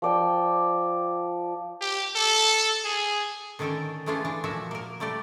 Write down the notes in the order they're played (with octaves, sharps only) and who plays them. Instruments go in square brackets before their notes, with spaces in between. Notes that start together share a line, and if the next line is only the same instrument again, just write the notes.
[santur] F3 D5 G5
[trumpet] G4
A4
G#4
[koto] D3 D#3 C#4 A4 A#4 G5
E3 G#3 A3 C#4 D4 F4
E3 D4
A#2 F3 F#4 E5
A#3 A#4
G3 A3 G4 D5